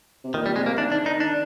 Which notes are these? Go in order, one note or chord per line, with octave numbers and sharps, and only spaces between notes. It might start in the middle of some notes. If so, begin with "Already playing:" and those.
C3
A#2 D#3
G3
C3 G#3
A#3
D#3 D4
D#3 D4
D#3 D#4
D4